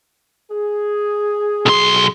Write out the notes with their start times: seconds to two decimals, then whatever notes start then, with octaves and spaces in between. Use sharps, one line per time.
0.51 G#4
1.66 B1 C6